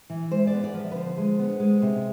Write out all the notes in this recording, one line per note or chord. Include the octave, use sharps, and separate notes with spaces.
E3
G#3 C5
D5
B3
D5
F3
E5
B4
D3 C5
G#3
B3
G#3
C3